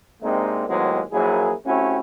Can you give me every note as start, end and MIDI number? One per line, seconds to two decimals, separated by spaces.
0.22 0.67 48
0.22 0.67 56
0.22 0.67 58
0.22 0.67 60
0.22 0.67 62
0.22 0.67 63
0.68 1.02 39
0.68 1.02 45
0.68 1.02 54
0.68 1.02 56
0.68 1.02 59
0.68 1.02 60
1.12 1.53 34
1.12 1.53 54
1.12 1.53 58
1.12 1.53 64
1.12 1.53 68
1.66 1.99 57
1.66 1.99 60
1.66 1.99 61
1.66 1.99 64
1.66 1.99 66
1.66 1.99 67